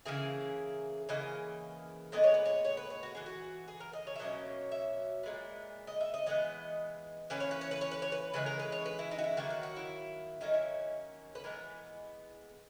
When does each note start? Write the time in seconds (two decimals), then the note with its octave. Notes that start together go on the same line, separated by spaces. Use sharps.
0.05 C#3 E3 A#3 G#4
1.09 C#3 E3 A#3 D#5
2.12 A#2 G#3 B3 D#5
2.24 C#5
2.34 B4
2.45 C#5
2.65 C#5
2.77 B4
2.90 C#5
3.03 F#4
3.15 E3 B3 G#4
3.26 F#4
3.68 G#4
3.80 A#4
3.93 D#5
4.07 C#5
4.15 E5
4.19 B2 F#3 A#3 C#4 D#5
4.72 E5
5.23 A#2 G#3 B3
5.87 D#5
6.01 E5
6.14 D#5
6.26 E3 G#3 B3 D#5
7.30 E3 A#3 C#4 B4
7.40 C#5
7.51 B4
7.61 C#5
7.71 B4
7.81 C#5
7.91 B4
8.02 C#5
8.12 B4
8.33 C#3 E3 G#3 B4
8.46 A#4
8.59 B4
8.72 C#5
8.86 B4
8.99 E4
9.11 D#4
9.18 F#4
9.24 E4
9.37 D#3 F#3 A#3 F#4
9.50 F#4
9.63 F#4
9.76 E4
10.41 D#3 F#3 A#3 C#4 D#4
10.54 E4
11.35 B4
11.44 E3 G#3 B3 A#4